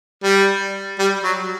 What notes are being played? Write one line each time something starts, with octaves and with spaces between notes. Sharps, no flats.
G3
G3
F#3